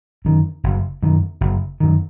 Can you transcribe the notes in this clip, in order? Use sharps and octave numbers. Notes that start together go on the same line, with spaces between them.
F#2 D#3
F#1
F#2 D#3
F#1
F#2 D#3